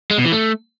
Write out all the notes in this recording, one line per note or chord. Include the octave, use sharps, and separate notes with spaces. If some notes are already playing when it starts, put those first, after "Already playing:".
G#3
B2
E3
A3